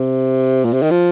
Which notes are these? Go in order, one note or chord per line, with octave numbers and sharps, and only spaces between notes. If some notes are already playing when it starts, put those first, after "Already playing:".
Already playing: C3
A#2
C3
D#3
F3